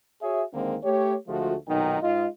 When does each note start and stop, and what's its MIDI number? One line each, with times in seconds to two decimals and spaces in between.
0.21 0.42 66
0.21 0.42 68
0.21 0.42 73
0.21 0.42 76
0.54 0.76 39
0.54 0.76 50
0.54 0.76 51
0.54 0.76 56
0.54 0.76 58
0.54 0.76 60
0.84 1.14 57
0.84 1.14 67
0.84 1.14 73
1.27 1.55 38
1.27 1.55 53
1.27 1.55 56
1.27 1.55 57
1.27 1.55 65
1.27 1.55 66
1.68 1.99 35
1.68 1.99 46
1.68 1.99 51
1.68 1.99 63
1.68 1.99 78
1.68 1.99 79
2.01 2.26 44
2.01 2.26 65
2.01 2.26 75